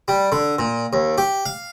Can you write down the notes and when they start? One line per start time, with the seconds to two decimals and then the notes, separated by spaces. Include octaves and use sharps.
0.08 G3
0.32 D3
0.59 A#2
0.93 D#2
1.18 G4
1.46 F5